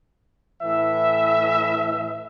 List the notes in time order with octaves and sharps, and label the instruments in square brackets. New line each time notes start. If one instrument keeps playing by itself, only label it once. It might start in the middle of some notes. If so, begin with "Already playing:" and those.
[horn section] A2 E3 E5